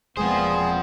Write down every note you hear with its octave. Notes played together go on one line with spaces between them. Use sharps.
E1 A#2 F3 G#3 B3 C4 G#4 C5